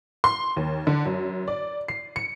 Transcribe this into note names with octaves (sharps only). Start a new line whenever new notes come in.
C6
D#2
D3
F#2
D5
C7
C#7